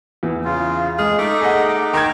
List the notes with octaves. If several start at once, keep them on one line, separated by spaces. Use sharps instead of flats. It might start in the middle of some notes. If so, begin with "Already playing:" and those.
E2 E3
C#3 F4
F2 G#3 G#4 F6
A3 D#4 D6
G#4 D#5 F#5
D#3 G5 A#5 D6 G#6